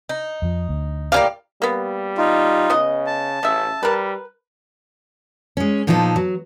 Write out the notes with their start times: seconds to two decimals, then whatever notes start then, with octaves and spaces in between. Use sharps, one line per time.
0.09 D#4
0.42 F2 F3
0.69 D2
1.12 A2 A#3 C#4 G4 D5 F5
1.62 G3 A#3 B3
2.18 D#4 F4
2.70 C#3 B3 D#5
3.07 A5
3.43 A1 C#3 E5
3.83 G3 A#4 B4
5.57 G#3 C#4
5.87 A#2 F3 B3 D#4 E4 A4
6.16 F#3